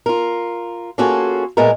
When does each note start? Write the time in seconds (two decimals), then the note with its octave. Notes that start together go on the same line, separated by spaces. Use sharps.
0.06 F4 A#4
0.98 A#3 C#4 F4 F#4 G#4 A4
1.57 A#2 G#3 A3 B3 A#4